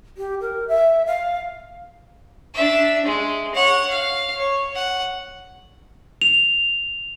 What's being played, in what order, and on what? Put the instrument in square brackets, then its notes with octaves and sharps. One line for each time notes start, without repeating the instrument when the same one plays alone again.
[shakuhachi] G4
A#4
E5
F5
[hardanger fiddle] D4 E5
G#3
C#5 F#5
F5
C#5
F#5
[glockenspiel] F7